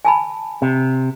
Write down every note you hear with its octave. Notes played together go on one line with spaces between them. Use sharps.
G#5 A5 B5
C3